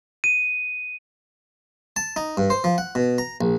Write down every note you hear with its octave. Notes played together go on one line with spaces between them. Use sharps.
D#7
A5
D#4
G2
C5
F3
F#5
B2
A#5
A#1